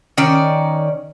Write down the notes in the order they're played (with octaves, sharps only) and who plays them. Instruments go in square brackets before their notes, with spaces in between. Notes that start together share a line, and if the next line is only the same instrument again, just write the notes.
[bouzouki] D#3 C#4 D5